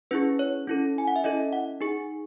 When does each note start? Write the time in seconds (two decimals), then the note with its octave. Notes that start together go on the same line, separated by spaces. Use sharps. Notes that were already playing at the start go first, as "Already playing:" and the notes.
0.11 C#4 E4 G#4 B4
0.39 C#5
0.68 C#4 E4 A4
0.98 G#5
1.08 F#5
1.16 E5
1.24 C#4 E4 A4 D#5
1.53 F#5
1.81 D#4 G#4